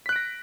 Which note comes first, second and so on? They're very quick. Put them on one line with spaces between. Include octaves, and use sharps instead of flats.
B6 F#6 D7 A#6